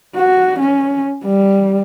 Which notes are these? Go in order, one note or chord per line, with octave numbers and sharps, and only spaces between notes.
F#4
C#4
G3